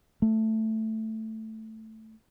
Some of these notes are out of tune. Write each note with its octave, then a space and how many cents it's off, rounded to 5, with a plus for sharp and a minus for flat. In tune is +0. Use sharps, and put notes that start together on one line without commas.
A3 +5